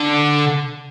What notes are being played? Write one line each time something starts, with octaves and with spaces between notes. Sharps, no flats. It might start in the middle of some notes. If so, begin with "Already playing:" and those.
Already playing: D3